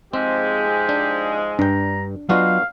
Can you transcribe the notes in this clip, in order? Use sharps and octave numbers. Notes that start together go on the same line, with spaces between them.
G#2 F3 G#3 C4 G4
D4
G2 D4 G5 A#5
F#3 B3 D4 F4 F#4 D#5 F5